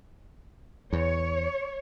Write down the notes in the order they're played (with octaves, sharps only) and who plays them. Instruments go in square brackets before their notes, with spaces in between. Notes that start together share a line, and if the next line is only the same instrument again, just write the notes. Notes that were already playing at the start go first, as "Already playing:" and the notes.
[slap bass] E2 [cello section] C#5